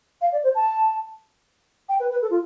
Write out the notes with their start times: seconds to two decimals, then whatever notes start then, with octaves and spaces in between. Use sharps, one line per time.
0.21 F5
0.32 D5
0.44 C5
0.55 A5
1.89 G5
2.00 B4
2.11 B4
2.22 A4
2.31 F4